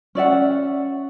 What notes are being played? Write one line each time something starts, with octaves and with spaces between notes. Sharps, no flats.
C#4 D5 E5 F#5